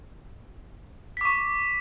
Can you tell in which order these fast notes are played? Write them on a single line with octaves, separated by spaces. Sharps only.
B6 D6 C#6